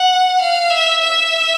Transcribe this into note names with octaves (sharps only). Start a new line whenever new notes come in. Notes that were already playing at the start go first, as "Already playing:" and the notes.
Already playing: F#5
F5
E5
E5